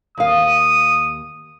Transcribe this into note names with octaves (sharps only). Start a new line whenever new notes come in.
D#2 F5 D#6